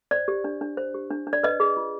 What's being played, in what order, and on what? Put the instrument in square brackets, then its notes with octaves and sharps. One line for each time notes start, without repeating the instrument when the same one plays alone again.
[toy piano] C5 D5
G4
D4
D4
C5
G4
D4
D4
D5
B4 D#5
G#4
F4